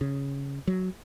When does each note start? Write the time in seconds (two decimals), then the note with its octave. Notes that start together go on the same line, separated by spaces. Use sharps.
0.01 C#3
0.67 F#3